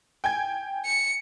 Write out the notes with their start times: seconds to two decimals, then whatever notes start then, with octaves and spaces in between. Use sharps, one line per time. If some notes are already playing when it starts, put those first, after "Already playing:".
0.24 G5 G#5 G#6
0.85 C#7